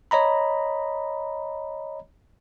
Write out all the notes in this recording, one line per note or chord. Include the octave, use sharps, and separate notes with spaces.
C#5 D#5 A#5 B5